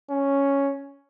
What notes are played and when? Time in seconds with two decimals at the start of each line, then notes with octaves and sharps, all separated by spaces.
0.10 C#4